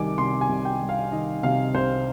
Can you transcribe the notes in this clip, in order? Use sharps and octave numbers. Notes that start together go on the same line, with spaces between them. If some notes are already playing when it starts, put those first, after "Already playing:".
Already playing: C2 D#3 G3 G#5 D6
C3 C6
G#5
C2
G5
G3
F5
D#3 D#5
C3 F5
C2 C5